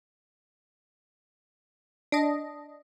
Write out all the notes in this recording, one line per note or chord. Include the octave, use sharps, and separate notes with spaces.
D4 D#5